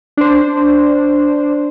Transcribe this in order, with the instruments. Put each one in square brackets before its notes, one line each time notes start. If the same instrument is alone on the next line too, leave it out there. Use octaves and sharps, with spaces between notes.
[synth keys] D4 C5